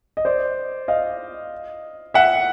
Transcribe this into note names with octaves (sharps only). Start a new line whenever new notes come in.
D#5
C5 D5
D#5 F5
E5 F#5